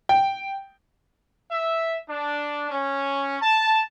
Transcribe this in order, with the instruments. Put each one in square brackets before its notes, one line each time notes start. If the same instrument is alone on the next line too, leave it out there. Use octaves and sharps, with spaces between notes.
[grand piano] G5
[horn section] E5
D4
C#4
A5